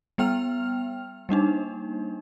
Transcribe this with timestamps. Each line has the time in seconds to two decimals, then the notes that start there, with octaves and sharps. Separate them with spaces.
0.18 G3 B3 G5 F6 F7
1.29 G3 A#3 D4 D#4